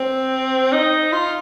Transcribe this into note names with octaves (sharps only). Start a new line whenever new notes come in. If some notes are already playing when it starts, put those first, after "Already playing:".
Already playing: C4
D#4
F4